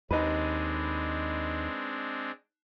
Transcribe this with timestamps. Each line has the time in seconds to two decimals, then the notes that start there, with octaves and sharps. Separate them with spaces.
0.11 D#2 G#3 C4 D4 D#4 B4